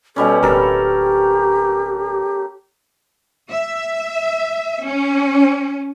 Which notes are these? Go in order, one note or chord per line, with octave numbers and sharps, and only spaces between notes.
B2 G3 C#4 A4
D1 G4 A4 A#4
E5
C#4